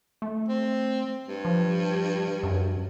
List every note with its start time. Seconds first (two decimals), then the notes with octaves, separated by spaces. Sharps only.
0.22 A3
0.48 C4
1.29 G2
1.45 F3
2.43 F#2